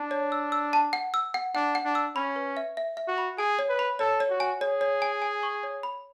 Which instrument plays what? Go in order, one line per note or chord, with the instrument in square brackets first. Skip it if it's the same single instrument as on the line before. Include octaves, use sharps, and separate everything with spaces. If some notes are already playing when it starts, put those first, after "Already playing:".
Already playing: [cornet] D4 [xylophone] A5
[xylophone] C#5
E6
E6
A5
F#5
E6
F#5
[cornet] D4 [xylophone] F#5
[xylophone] F#5
[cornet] D4
[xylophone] E6
[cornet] C#4 [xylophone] B5
[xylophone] B4
E5
E5
E5
[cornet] F#4
[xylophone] B5
[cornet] G#4 [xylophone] G#5
[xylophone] C#5
[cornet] B4
[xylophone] B5
[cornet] A4 [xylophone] C#5
[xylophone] C#5
[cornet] F#4
[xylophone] G#5
[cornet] G#4 [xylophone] C#5
[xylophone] C#5
G#5
G#5
C#6
C#5
B5